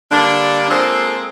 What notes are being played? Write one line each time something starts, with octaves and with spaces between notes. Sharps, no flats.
D3 G3 A#3 D4
G#3 A#3 C4 F4 G#4 A4